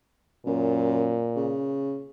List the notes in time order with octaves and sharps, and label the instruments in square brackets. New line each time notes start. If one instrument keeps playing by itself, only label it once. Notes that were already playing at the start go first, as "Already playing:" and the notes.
[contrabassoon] F#2 [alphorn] A#2
[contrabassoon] C#3